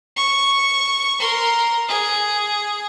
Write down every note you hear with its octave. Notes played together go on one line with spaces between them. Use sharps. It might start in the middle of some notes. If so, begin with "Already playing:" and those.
C#6
A#4 C6
G#4